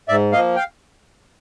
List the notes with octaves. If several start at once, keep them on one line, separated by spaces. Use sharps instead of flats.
G#2 D5 E5
F3 A#3 D#5 F5
F5 G5